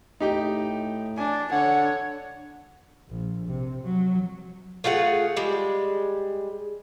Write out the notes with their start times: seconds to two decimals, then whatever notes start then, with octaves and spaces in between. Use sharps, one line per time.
0.20 A2 D#4 G4 G5
1.18 D4 G#5
1.52 D3 C#5 F#5
3.09 A#1
3.48 C3
3.84 F#3
4.84 A3 F4 G#4 F#5
5.37 G3 G#3